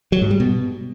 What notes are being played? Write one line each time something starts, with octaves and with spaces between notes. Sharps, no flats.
F#3
G#2
G3
B2